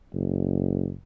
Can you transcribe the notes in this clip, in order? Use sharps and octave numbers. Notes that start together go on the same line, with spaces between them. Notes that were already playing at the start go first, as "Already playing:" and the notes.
F#1